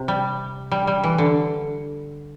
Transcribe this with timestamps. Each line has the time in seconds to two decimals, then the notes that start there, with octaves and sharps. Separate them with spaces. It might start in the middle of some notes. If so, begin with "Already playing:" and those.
Already playing: C3
0.08 G3
0.71 G3
0.87 G3
1.04 E3
1.18 D3